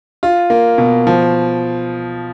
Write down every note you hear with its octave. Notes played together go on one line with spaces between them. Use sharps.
F4
A#3
B2
F3